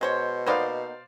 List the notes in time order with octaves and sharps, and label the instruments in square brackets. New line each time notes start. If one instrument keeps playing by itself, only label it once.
[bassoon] B2 [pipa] G#3 C5 C#5
[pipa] A#3 B3 D#4 [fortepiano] C5 D5 F5